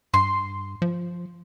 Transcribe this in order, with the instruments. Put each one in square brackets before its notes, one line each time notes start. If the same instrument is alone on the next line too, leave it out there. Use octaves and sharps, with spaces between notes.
[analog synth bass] G2 [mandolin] C6
[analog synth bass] F3